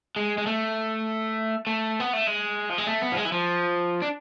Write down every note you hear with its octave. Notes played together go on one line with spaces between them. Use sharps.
G#3
G#3
A3
A3
B3
A3
G#3
F3
G#3
A3
B3
F3
G#3
E3
F3
D4